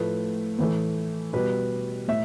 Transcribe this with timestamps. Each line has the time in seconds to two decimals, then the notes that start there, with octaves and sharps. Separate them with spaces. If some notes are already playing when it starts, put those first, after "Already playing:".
Already playing: A2 F3 A3 B4
0.59 A2 E3 A3
1.33 B2 G3 B4
2.08 A2 E5